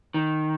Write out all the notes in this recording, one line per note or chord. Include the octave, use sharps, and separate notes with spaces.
D#3